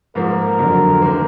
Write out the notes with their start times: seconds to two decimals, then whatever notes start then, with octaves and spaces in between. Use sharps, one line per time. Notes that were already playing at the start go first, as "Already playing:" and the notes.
0.15 G#2 F3 A#3 A#4
0.59 F2 D3 F#3
1.02 D#3 A#3